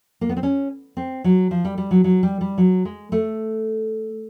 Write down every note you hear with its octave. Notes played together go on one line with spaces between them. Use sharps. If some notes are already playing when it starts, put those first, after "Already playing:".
A#3
B3
C4
C#4
C4
F#3
F3
G3
G3
F#3
F#3
G3
G3
F#3
G#3
A3